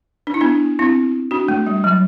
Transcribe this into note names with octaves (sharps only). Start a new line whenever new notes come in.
D4
E4
B3 D4
C4 E4
D4 F#4
A3
G3
F#3